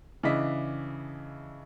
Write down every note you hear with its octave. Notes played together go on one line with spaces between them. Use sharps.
C#3 E3 D4 E4 D#5 B6